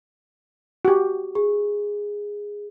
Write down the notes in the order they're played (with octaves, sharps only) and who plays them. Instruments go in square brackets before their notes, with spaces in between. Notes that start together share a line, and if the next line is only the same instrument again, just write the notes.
[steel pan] F#4 G4
[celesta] G#4